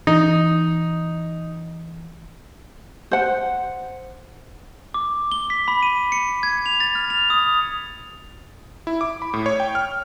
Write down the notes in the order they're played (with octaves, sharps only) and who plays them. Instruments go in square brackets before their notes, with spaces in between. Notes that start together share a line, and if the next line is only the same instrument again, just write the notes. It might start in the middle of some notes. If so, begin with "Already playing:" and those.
[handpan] E3 [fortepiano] D#4
[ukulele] C5 F#5
[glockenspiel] D6
G7
B6
B5
D#7
C#7
G#6
F7
A6
F6
F7
D#6
[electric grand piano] E4
D6
B5
A2
C#5
G5
F6